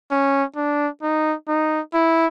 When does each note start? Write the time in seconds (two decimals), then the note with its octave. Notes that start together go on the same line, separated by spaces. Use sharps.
0.11 C#4
0.56 D4
1.03 D#4
1.48 D#4
1.94 E4